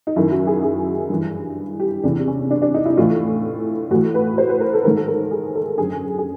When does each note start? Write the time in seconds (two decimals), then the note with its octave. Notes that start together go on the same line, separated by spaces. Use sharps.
0.07 D#4
0.16 F#2 D#3 E4
0.31 F#4
0.47 G#4
0.63 G#4
1.10 G2 E3
1.80 G4
2.03 E2 C3 E3 D4
2.28 C#4
2.51 D4
2.62 D4
2.74 D#4
2.86 E4
2.97 A2 E3 F4
3.91 A2 E3 F#4
4.14 B4
4.38 C5
4.49 B4
4.60 A#4
4.73 A4
4.84 G#2 D#3 A#4
4.96 A4
5.08 A#4
5.31 G#4
5.55 A4
5.77 F#2 D3 G#4
6.18 G#4